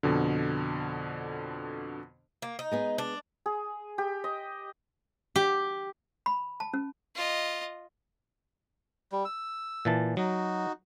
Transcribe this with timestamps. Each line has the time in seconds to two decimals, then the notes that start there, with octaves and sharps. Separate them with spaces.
0.03 F2 B2 D3
2.42 A#3
2.59 D#4
2.72 G#3 B3 G#4
2.98 D4
3.46 G#4
3.98 G4
4.24 D#5
5.36 G4
6.26 B5
6.60 A5
6.74 C#4
7.16 F4 D#5
9.12 G3
9.25 E6
9.85 A#2 E3 A5
10.17 F#3 D#4 F#4